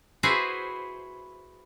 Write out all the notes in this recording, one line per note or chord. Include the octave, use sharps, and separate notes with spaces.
E4 F#4 G#4 B4 C5